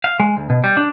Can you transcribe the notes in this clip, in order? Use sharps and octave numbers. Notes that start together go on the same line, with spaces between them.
F5
G#3
D2
B2
G3
D4